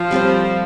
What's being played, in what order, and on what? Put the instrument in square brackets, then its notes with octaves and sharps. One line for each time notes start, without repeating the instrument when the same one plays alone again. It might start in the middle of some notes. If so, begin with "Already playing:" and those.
Already playing: [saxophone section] F3
[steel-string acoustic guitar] G3 C4 A4 C5